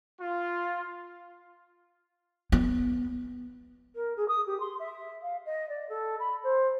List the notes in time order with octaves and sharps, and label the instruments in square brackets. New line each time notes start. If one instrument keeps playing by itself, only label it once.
[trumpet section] F4
[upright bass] B3
[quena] A#4
G#4
D#6
G4
C6
E5
F5
D#5
D5
A4
B5
C5